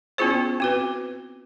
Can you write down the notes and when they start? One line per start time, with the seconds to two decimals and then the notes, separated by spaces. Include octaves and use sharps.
0.18 B3 C#4 E4 F4 G#4 C5
0.60 C4 F#4 B4